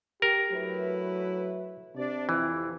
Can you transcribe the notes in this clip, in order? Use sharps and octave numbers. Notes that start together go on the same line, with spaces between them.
G4 A#4
F#3 A3 E4 B4
C3 D4 D5
F2 E3